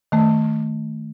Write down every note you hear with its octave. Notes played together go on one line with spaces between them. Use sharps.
D#3 A3